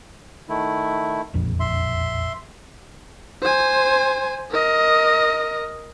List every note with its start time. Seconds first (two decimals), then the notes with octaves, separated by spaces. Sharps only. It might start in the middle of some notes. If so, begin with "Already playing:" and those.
0.49 D#3 A3 E4
1.34 E1 A#1 F2
1.60 E5 C6
3.42 C5 G#5
4.51 A#4 D#5